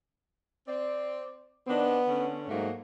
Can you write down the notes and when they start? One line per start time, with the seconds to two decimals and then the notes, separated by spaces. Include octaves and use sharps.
0.67 C4 D5
1.67 D#3 B3 C4 D4
2.08 D3 C#4
2.49 G#2 F#3 A3 A#3